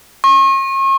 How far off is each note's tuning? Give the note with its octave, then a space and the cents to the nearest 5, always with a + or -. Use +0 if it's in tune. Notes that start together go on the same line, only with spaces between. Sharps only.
C#6 -40